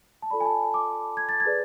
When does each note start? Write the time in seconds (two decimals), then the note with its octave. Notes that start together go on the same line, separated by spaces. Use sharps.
0.22 A5
0.31 F4 A4 D5 B5
0.40 G#5
0.46 A5
0.74 D6
1.17 G#6
1.29 A6
1.40 G#6
1.46 G#4 B4 D5